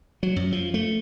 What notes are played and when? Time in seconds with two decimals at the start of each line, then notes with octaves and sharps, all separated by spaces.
0.23 F#3
0.36 F#2
0.52 F3
0.74 A3